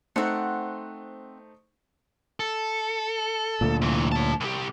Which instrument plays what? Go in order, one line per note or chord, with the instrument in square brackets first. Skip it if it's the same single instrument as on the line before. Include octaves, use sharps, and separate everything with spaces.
[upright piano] A3 D#4 C5 [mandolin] C4 F#5
[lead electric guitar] A4
[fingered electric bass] D2 A#2
[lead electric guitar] C3 E3
C#5 A5
C2 G4